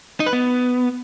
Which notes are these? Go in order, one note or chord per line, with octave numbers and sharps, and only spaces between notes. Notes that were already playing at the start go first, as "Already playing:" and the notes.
D#4
B4
B3